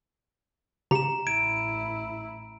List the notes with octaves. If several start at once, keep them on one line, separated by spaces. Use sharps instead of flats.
C#3 G4 A#5 C#7 E7
A1 E4 G#6 D7